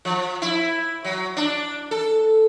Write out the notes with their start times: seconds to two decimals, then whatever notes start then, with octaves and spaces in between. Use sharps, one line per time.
0.05 F3
0.42 E4
1.04 F#3
1.37 D4
1.91 A4